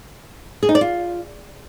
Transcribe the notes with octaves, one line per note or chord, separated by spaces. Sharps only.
G#4
D#4
D5
F4